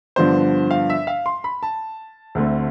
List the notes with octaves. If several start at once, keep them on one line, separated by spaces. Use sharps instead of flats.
G2 D3 F3 B3 D4 C5
F5
E5
F5
C6
B5
A5
D2 D3 A3 C4